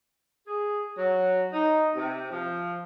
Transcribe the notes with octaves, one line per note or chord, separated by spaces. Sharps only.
G#4
F#3
D#4
C3
F3